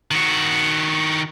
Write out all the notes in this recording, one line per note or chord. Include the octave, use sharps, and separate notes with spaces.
D#3 F#4